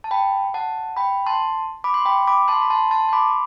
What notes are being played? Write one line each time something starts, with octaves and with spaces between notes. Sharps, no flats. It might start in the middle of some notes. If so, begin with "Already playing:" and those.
A5
G5 B5
F#5 A5
G5 B5
A5 C6
B5 D6
C6
G5 B5
B5 D6
A5 C6
B5
A5 C6
A5 C6
C6
B5 D6